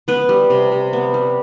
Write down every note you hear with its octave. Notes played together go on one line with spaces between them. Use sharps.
B3 B4
G3
C3
C3
B3
G3